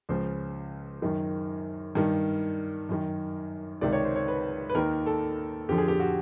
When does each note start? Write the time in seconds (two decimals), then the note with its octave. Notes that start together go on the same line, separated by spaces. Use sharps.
0.09 C#2 C#3 F3 C5
1.02 F#2 D#3
1.95 G2 D#3
2.89 F#2 D#3
3.81 C#2 C3 D#3 D5
3.93 C#5
4.04 C5
4.16 C#5
4.28 B4
4.70 B4
4.74 D#2 D#3 A#4
5.06 A4
5.69 F2 D3 F3 G4
5.78 G#4
5.88 G4
6.00 F#4